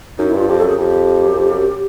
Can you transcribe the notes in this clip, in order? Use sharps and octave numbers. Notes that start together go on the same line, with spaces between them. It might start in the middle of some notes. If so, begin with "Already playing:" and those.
F#2 D#4
E4
G2 F4
F2 G4
F#2 A4
G#4
F2 G4
F#2
F2
F#2